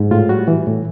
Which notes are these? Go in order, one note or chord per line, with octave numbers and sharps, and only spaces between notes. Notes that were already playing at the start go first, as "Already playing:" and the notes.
Already playing: G#2
A2 F4
G3 F#4
E3
A2